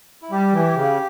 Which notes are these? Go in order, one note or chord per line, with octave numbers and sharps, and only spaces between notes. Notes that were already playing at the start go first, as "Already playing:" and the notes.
E4
G3 G4
E3
C#3